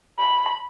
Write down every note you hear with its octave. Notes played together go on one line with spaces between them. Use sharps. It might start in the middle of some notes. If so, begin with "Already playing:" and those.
B5